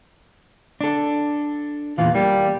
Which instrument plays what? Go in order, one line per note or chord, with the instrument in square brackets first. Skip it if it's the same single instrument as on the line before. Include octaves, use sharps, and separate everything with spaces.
[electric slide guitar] D4 A4
[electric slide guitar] E2 A#2 E3 [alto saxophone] F4
[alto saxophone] G3 [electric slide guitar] A#3